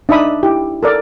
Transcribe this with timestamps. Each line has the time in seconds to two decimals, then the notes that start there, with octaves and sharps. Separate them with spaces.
0.09 D4 D#4 D#5 E5 B5 D#6
0.43 E4 G4
0.83 A4 A#4 D5